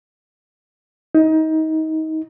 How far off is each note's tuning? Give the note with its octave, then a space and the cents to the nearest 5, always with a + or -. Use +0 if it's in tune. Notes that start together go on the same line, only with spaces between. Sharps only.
D#4 +25